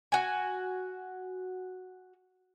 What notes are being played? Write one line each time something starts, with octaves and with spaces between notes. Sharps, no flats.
F#4 G#5